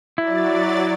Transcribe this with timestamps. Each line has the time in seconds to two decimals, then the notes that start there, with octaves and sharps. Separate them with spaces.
0.18 F#3 E4 D5 A6